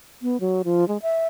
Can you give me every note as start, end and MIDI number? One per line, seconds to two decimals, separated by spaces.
0.22 0.40 59
0.40 0.62 54
0.65 0.87 53
0.88 0.97 56
1.02 1.27 76